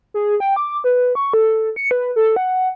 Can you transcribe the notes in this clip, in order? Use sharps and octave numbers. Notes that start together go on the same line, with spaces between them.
G#4
G5
D6
B4
C#6
A4
C#7
B4
A4
F#5